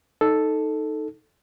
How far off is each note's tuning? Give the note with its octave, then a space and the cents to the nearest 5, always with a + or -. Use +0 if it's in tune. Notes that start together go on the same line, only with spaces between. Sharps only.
D#4 +0 A4 +0